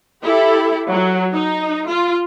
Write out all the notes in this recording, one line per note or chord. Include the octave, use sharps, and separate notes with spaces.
E4 G4 A4
F#3
D#4
F4